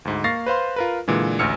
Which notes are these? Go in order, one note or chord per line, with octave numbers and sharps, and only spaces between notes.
D2 G#2
A#3 F5 C#6 A6 A#6 C7
B4 C5 F5 C6
F4 A#4 B4
A#2 D3 E3 G#3
A1 D2 G#5 E6 F6 C#7